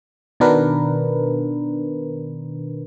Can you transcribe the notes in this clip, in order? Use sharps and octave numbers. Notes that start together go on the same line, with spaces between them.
B2 D#3 B3 D4 A#4 B4